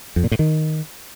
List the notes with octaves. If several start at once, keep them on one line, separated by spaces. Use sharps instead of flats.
F2
A#2
A2
D#3